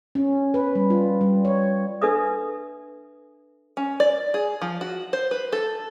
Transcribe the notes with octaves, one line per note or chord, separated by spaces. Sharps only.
C#4
B4
G3
F4
G3
C#5
D4 A4 B4 E5 D#6
C#4
D5
G#4
F3
F#4
C5
B4
A4